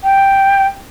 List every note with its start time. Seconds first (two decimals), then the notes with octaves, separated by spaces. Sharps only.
0.04 G5